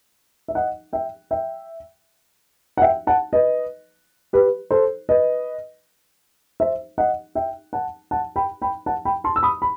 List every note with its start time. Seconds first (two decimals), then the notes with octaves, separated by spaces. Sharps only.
0.48 E5
0.55 D#5 F#5
0.93 E5 G5
1.31 E5 G5
2.77 F#5
2.82 E5 G5
3.07 F#5 A5
3.33 B4 D#5
4.33 G4 B4
4.71 A4 C5
5.09 B4 D#5
6.60 C5 E5
6.98 D#5 F#5
7.35 E5 G5
7.73 F#5 A5
8.11 F#5 A5
8.36 G5 B5
8.62 G5 B5
8.86 F#5 A5
9.05 G5 B5
9.24 A5 C6
9.36 E6
9.43 B5 D#6
9.62 B5